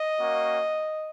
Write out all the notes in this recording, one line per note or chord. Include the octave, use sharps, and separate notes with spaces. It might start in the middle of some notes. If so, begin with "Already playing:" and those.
Already playing: D#5
A#3 C#4 F#4